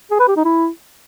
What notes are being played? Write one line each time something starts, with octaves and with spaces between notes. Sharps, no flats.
G#4
B4
G4
D#4
E4